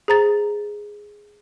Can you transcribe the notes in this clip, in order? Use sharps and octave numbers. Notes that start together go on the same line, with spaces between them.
G#4 C5 A#5 A6